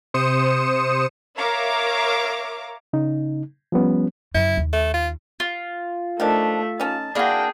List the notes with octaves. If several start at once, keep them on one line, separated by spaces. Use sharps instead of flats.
C3 C5 D#6 C#7 E7
A#4 C#5 E5 F5 A#5 D6
C#3 D#4
F3 G3 B3 C#4
F#2 C#3 E4
D#2
A3
F4
F4
D#3 F3 A3 D4 E5
C#4 D#4 A5
A#3 D4 E4 F#4 G#4 G5